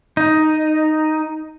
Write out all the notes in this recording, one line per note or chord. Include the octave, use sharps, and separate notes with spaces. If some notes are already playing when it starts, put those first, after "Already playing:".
D#4